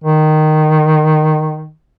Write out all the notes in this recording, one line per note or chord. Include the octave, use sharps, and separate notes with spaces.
D#3